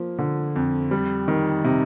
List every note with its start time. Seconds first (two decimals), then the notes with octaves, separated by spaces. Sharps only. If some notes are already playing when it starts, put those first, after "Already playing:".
Already playing: F3 A#3
0.19 D3
0.56 F2
0.91 G3
1.28 D#3
1.64 C3